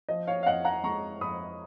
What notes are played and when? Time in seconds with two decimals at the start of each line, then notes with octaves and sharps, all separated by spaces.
0.09 F3 D#5
0.27 C#5 F5
0.43 F5
0.46 F2 D#5 F#5
0.65 F#5 A#5
0.83 G#3 A#5 C#6
1.21 F2 B5 D#6